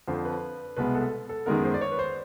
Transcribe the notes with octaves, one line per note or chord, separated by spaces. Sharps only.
F2 D3 F3 C5
B4
C2 B2 G#3 B3 B4
A4
A4
F#2 D#3 G#3 B3 A#4
C5
D5
C#5
B4
C5